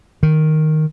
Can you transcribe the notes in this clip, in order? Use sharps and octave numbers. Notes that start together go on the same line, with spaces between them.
D#3